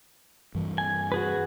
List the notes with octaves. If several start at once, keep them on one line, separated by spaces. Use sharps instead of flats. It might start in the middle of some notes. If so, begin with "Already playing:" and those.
G2 E3
G#5
F#4 G#4 B4